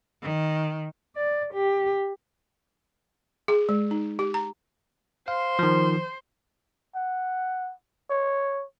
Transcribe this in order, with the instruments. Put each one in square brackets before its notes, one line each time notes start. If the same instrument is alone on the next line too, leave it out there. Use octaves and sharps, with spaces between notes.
[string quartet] D#3
[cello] D5
G4
[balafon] G#4
G#3
D#4
G4
A#5
[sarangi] C5 [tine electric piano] F5
[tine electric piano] D#3 F3
[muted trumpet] F#5
C#5